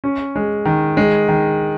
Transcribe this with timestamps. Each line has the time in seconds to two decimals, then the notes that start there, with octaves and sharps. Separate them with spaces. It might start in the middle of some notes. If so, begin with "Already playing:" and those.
0.04 C#4
0.36 G#3
0.65 D#3
0.97 G#3
1.28 D#3